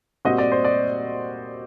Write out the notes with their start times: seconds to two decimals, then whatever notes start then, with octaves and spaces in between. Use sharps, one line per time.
0.25 A#2 G3 C4 F#4 D#5
0.38 D5
0.52 C5
0.65 D5